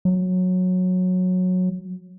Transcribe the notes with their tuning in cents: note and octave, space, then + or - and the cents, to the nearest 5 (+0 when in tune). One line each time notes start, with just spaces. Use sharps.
F#3 -15